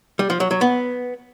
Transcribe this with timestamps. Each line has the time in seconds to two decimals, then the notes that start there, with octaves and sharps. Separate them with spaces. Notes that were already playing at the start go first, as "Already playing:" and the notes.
0.19 G3
0.30 F3
0.40 F#3
0.51 F#3
0.61 B3